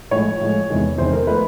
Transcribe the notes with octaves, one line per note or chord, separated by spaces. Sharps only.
A2 F3 G#3 C#5
A2 F3 G#3
E2 C3 D#3 G#3
E2 C3 D#3 G#3 C5
A#4
F3 A3 B4